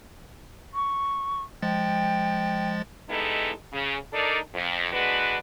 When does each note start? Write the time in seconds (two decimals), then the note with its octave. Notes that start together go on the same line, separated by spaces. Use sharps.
0.74 C#6
1.62 F3 G#3 G5 A6
3.10 G3 G#3 B3 D#4 E4 A4
3.72 C#3
4.13 D4 D#4 A4 A#4 D5
4.54 F2
4.92 D3 G#3 D4 F#4 B4